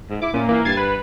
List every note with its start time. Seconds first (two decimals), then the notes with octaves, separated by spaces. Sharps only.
0.10 G#2
0.22 E4 D6
0.34 A#2 C#4
0.49 E3 A#3
0.65 G2 G#6 A6 C7
0.77 B4